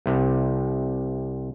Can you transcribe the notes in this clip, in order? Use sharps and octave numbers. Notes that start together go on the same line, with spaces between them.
C2 C3